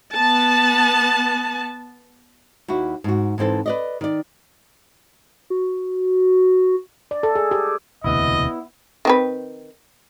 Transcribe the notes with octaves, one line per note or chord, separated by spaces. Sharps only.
B3 A5
D#2 E4 F#4
G#2 F#4
G#2 E3 C4 A4
B4 D5 D#5
D#3 D5
F#4
D5
A4
G#4
G4
E1 D2 C3 B3 E4 D#5
D#3 C4 B4